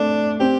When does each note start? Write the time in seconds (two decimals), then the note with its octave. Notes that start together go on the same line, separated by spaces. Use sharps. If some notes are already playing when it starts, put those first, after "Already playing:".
Already playing: A3 C4 D4
0.40 C4 G4